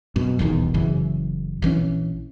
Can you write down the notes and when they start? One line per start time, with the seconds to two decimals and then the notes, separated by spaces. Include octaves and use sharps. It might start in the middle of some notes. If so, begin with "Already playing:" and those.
0.16 F#2 B2
0.39 D#1 B1 E2 D#3
0.74 F#1 F#2 C#3 E3
1.62 A#1 E3 G3 C#4